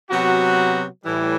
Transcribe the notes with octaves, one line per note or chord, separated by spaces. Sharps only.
C3 F#3 B3 F#4
A2 E3 G3